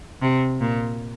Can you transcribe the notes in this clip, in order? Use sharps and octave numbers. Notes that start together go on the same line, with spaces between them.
C3
A#2